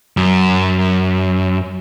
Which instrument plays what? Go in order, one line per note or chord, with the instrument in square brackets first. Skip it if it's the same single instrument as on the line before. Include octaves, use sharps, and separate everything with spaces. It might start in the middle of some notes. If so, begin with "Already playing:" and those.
[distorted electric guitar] F#2